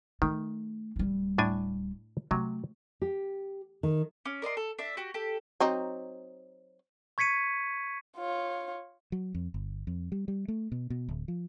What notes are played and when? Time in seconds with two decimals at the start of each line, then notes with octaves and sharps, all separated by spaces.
0.22 D#3 A3
0.96 D1 G3
1.38 A2 D4 G#5
2.31 C3 F#3 A3
3.02 G4
3.83 D#3
4.25 C#4 D6
4.42 A#4 D5 D#5 C6
4.57 A4
4.79 D4 D5 E5
4.97 F#4 G4
5.14 G4 A4
5.60 F#3 C4 D#4
7.18 C#6 G#6 B6 C#7 D#7
8.17 F4 C#5
9.12 F#3
9.35 F2
9.54 G1
9.87 F2
10.12 G3
10.28 G3
10.48 A3
10.72 B2
10.90 B2
11.09 D1
11.28 F3